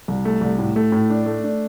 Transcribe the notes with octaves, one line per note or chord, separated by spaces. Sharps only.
C2
A3
C2
A2
A3
A2
D4
A3
D4